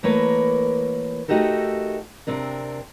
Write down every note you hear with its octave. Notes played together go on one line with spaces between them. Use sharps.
E3 A3 A#3 A#4 B4 C#5
A3 D#4 F#4 G4 A4 A#4
C3 C4 D4 A#4